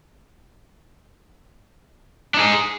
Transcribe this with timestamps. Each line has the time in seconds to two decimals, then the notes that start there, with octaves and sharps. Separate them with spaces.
2.34 D4
2.37 D#4
2.40 G#4